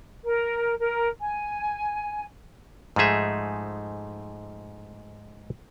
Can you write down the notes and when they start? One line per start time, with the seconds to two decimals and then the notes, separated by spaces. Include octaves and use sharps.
0.24 A#4
0.79 A#4
1.20 G#5
2.96 G#2 F3 A3 D#4 G#4 E5